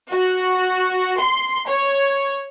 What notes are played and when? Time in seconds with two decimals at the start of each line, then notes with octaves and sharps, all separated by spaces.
0.11 F#4
1.18 C6
1.68 C#5